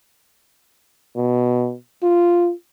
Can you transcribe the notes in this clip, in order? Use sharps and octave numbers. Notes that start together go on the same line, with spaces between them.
B2
F4